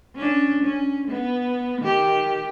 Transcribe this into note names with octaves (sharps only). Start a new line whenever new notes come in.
C#4 D4
C#4
B3
D#3 G4